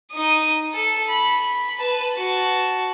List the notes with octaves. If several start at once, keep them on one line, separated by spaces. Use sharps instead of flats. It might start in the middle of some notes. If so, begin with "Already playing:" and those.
D#4 D#6
A4
B5
B4 A5
F#4 A5